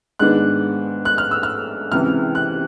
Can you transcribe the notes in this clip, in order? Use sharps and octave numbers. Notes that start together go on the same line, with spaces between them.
G#2 D#3 G#3 B3 D4 F#6
F#6
F6
E6
F6
C#2 C3 E3 F6
F#6